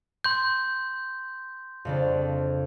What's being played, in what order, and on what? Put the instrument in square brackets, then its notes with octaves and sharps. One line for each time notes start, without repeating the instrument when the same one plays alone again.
[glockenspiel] C6 G6
[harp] F2 C#3 D4